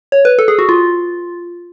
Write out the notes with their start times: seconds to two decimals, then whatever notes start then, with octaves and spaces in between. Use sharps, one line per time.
0.12 C#5
0.25 B4
0.39 A4
0.48 G#4
0.59 F#4
0.69 F4